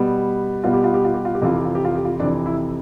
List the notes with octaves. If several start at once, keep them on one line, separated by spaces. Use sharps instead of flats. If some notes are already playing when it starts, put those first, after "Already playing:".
Already playing: B2 G3 B3
B2 G3 B3 F4
G4
F4
G4
F4
G4
F4
G4
F2 C3 E3 F4
G4
F4
G4
F4
G4
F4
F2 C3 E3 D4
E4